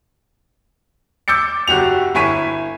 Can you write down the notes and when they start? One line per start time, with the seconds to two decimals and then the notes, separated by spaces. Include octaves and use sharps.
1.28 D6 E6 G6 A6 C#7
1.67 F#1 F#4 G4 F7
2.15 G1 E4 G#5 C#6 B6 D#7